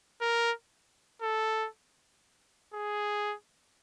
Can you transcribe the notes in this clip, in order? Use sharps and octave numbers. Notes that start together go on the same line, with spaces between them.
A#4
A4
G#4